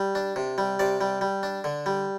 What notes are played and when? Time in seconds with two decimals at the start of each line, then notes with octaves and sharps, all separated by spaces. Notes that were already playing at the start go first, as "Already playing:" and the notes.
Already playing: G3
0.15 D4
0.36 C3
0.58 G3
0.79 C3 D5
1.01 G3
1.21 G3
1.43 D4
1.64 D3
1.86 G3